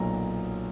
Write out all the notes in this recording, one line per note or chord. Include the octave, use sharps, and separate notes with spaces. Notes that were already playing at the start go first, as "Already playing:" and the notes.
Already playing: B1 A#2 F#3 A#5